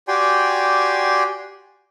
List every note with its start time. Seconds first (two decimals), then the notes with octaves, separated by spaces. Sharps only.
0.08 F#4 G4 D5 G5 G#5 C6